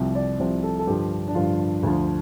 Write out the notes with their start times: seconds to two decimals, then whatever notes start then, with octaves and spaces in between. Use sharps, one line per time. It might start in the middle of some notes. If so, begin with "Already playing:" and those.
Already playing: C2 C3 F3
0.15 D5
0.39 C2 C3 F3 C5
0.63 A4
0.79 A4
0.87 G2 D3 F3 G4
1.28 D4
1.35 G2 D3 F3 F4
1.83 D2 D3 F3